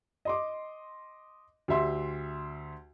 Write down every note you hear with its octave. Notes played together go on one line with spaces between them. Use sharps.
D#5 C6 D6
D2 G4 E5 C6